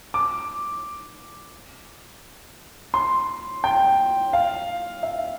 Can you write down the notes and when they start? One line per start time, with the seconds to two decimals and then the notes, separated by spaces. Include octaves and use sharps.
0.14 D6
2.94 C6
3.64 G5
4.33 F5
5.03 E5